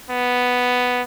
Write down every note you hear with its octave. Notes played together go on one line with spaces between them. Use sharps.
B3